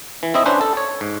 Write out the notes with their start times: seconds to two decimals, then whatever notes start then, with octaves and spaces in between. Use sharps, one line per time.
0.23 E3
0.34 C4 E4 D#5 E5
0.46 C#4 D4 B4 C5
0.61 A4
0.77 C#5
1.01 G#2